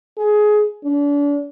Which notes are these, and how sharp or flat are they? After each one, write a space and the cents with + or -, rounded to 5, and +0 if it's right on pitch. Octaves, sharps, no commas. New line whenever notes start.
G#4 +20
D4 -35